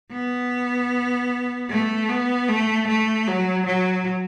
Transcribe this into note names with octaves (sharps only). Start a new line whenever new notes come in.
B3
A3
B3
A3
A3
F#3
F#3